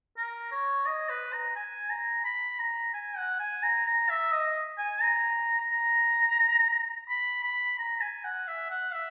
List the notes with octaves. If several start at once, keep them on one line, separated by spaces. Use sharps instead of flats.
A#4
C#5
D#5
B4
A#5
G#5
A#5
B5
A#5
G#5
F#5
G#5
A#5
A#5
E5
D#5
G#5
A#5
A#5
B5
B5
A#5
A#5
G#5
F#5
E5
F#5
E5